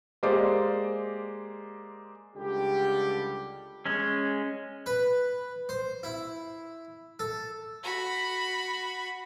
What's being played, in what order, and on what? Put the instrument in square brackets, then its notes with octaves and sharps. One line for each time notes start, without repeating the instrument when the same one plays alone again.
[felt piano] G#3 A#3 G4 C5 D5
[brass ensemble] C#2 D3 G3 G4
[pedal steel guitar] G#3 C#4
[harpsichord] B4
C5
E4
A4
[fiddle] F#4 B5